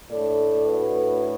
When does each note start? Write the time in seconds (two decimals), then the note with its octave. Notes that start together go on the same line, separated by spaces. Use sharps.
0.10 A2 A3 D4 A4 D5
0.66 F#4 B4